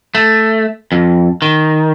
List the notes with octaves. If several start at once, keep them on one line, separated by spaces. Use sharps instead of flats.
A3
F2
D#3